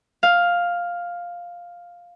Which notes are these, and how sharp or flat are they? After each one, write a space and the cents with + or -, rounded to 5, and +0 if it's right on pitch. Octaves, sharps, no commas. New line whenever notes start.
F5 +5